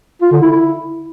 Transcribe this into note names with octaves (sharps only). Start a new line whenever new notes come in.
F4
D3
E4
E4